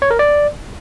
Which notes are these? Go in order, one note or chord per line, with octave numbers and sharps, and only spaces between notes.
C#5
A#4
D5